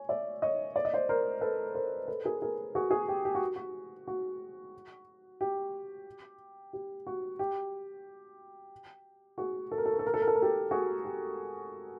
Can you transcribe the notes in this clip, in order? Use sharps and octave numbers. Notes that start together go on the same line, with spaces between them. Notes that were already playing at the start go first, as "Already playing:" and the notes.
Already playing: C#5 G#5
D5 E5
C#5 D#5
D5
D#5
C5 D5
A#4 C5
A4 B4
A#4 C5
A4 B4
G#4 A#4
G#4 A#4
F#4 G#4
F#4 G#4
G4
G4
F#4
F#4
F#4
G4
G4
F#4
G4
F#4 G#4
A4
A#4
A4
A#4
A4
A#4
A4
A#4
A4
A#4
G4 A4
F#4 G#4
G4